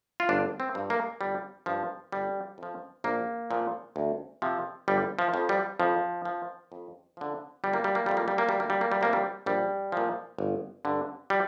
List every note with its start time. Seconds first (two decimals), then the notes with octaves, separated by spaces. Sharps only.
0.20 F4
0.29 G1 D4
0.60 C4
0.75 G2 F3
0.90 A#3
1.21 G1 G3
1.66 G2 F3
2.12 G1 G3
2.58 F2 F3
3.04 A#1 A#3
3.51 A#2 F3
3.96 D2
4.42 C3 F3
4.88 G1 G3
5.19 F3
5.34 F2 F3
5.49 G3
5.80 F2 F3
6.25 F3
6.72 F2
7.17 D3 F3
7.64 G1 G3
7.73 A#3
7.84 G3
7.95 A#3
8.06 F2 F3 G3
8.17 A#3
8.28 G3
8.38 A#3
8.49 G3
8.55 D2 A#3
8.70 G3
8.81 A#3
8.92 G3
9.01 C3 F3 A#3
9.13 G3
9.46 A#1 G3
9.92 A#2 F3
10.38 G1
10.85 G2 D3
11.30 G3